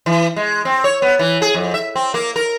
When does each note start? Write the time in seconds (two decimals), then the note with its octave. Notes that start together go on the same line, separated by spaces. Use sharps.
0.06 E3
0.36 G#3
0.65 C4
0.84 C#5
1.02 B3
1.19 E3
1.42 G#4
1.54 F2
1.74 E5
1.96 C4
2.14 A#3
2.36 A#4